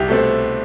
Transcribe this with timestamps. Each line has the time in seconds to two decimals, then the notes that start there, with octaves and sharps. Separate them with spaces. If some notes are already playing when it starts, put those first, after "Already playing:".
Already playing: C2 G4
0.08 B2 A3 C4 A4